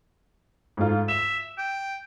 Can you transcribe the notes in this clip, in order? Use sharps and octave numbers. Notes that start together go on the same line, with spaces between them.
G#2 A3 F4
E5 E7
G5